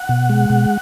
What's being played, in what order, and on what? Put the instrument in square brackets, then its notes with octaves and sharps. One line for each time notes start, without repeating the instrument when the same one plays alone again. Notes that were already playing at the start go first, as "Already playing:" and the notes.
Already playing: [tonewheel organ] F#5
B2
G#3
B2